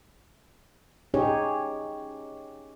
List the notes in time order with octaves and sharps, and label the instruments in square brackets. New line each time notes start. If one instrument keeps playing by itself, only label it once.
[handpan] C#4 D#4 G4 G#4 C#5